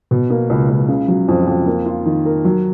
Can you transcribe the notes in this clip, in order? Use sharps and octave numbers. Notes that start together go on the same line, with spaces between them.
B2
A#3
C#2
C#2
C#3
F#3
F2
F2
A#3
F4
D#3
A#4
F#3